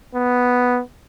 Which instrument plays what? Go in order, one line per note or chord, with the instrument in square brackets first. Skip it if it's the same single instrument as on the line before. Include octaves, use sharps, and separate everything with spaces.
[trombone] B3